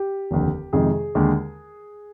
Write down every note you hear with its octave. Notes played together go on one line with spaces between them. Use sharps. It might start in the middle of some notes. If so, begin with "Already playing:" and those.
Already playing: G4
F1 D#2 D3
F2 C3 D#3 G#3 G#4
D#2 D3 G#3